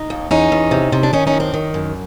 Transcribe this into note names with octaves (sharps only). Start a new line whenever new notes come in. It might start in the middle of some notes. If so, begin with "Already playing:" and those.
Already playing: D#4
D#2
E2 C#4 D#4
E2
C3
C3
D4
D#3 C#4 D#4
C#4 D#4
F#2
C4 D4
D#3
F#2